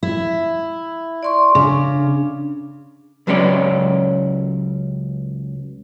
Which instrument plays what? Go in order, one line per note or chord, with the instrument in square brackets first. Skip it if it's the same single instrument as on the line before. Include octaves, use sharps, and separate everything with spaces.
[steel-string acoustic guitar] E4
[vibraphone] D5 C6 C#6
[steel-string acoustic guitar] C#3 [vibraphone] D4
[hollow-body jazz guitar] C#2 F#3 G#3 C#4 C#5 D5